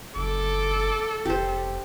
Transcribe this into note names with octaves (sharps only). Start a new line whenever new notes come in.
F#1 A4 D6
F1 G4 C5